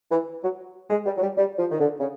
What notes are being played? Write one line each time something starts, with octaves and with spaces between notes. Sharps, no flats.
E3
F#3
G#3
G3
F#3
G3
G3
F3
D#3
D3
C#3